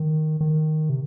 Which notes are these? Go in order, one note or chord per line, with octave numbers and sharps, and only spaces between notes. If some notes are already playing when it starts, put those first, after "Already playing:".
Already playing: D#3
D#3
C3